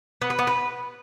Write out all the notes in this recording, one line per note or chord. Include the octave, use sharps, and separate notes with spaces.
B3
B4
B3
B4